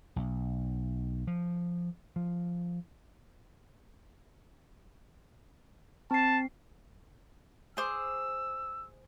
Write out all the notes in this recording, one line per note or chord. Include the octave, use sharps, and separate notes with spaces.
B1
F3
F3
C4 A5 C7
G#4 C5 D6 E6